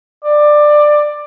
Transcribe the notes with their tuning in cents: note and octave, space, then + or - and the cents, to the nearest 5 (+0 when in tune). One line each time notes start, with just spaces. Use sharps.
D5 +15